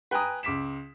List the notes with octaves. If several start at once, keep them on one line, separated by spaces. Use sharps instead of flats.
B4 G5 G#5 A#5 D#6
C#2 D6 B6 E7